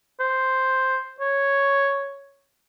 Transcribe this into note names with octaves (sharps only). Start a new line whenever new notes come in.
C5
C#5